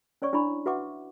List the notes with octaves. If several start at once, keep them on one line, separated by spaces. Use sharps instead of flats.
C#4 C#5 D5 C#6
D4 E4 D5 B5 C#6
F#4 B4 E5 F#5 C#6 D6